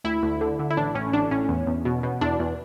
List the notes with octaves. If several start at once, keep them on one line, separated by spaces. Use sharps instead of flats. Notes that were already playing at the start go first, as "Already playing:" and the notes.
D2 E4
D2
D3
D3
E4
A1 D4
A2 C#4
A1 D4
A2 C#4
E2
E2
B2
B2
E2 D4
E2